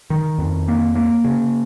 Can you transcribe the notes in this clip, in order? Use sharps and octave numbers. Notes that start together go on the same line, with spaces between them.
D#3
F2
A#3
A#3
C#3